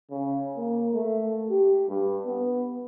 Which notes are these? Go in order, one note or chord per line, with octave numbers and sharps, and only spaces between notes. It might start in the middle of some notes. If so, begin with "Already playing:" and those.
C#3
A#3
A3
G4
G2
B3